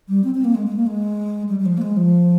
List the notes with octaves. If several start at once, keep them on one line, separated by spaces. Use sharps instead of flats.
G3
C4
C4
A#3
G#3
G#3
A#3
G#3
G3
G3
F3
A#3
G#3
F3